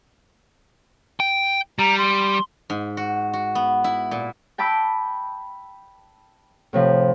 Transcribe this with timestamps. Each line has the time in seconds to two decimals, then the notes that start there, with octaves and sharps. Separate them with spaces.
1.20 G5
1.79 G3 A#5
1.98 C6
2.70 G#2
2.97 F#4
3.33 F#4
3.55 B3
3.84 E4
4.11 A#2
4.58 G5 A5 B5 D6 E6
6.73 A2 C3 F3